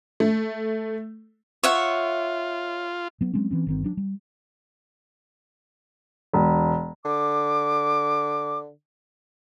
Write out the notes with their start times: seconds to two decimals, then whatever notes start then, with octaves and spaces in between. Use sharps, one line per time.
0.20 A3
1.63 F4 C#5 E5 F#5
3.21 F#3 B3
3.34 F#3 G#3 C4 C#4
3.51 E3 C4 C#4
3.67 G1 D#3 C4
3.84 F#3 D4
3.97 G3
6.33 E1
7.05 D3 D6